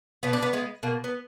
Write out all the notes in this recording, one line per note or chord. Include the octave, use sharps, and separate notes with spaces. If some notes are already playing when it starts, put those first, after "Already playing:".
B2 B3
D4
B3
G#3 B3
B2 A#3
B3